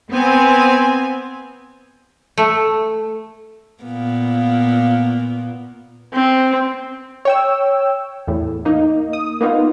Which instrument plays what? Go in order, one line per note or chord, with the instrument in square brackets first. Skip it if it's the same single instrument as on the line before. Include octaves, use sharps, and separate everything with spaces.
[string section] B3 C4 G#5
[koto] A3
[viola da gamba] A#2 A#3 B3
[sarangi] C4
[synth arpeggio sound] C#5 G5 E6
E2 A2
A#3 D#4
D#6
A#3 B3 D#4 F4